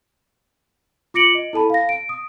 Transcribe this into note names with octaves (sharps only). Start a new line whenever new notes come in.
F4 D6 A#6 C#7 D7 F#7
D#5
E4 A4 A5 B5
F5 A#6
D7
D#6